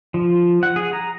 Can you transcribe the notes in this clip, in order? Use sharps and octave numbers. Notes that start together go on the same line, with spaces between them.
F3
F#5
G#4
A#5